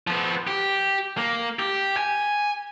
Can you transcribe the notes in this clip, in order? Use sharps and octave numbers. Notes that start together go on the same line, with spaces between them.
F3 B3
G4
A#3
G4
G#5